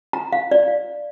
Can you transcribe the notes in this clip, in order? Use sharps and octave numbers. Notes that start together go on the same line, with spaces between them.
A#5
F5
D5
F5